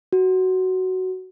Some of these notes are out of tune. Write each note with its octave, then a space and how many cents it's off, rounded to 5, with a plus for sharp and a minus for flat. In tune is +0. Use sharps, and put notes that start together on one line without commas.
F#4 +10